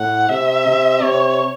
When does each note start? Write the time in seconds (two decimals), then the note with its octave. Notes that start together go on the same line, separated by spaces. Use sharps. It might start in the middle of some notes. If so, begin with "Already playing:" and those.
Already playing: A2 F#5
0.29 C3 E5
0.67 C3
1.03 C3 C#5